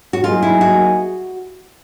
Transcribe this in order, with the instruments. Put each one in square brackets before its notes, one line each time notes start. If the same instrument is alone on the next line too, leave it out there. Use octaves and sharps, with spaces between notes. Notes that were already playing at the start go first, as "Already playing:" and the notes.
[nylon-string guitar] F#4
[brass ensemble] F#3 A#3 D#4 G#4 [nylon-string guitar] F4
[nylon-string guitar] E4
F#4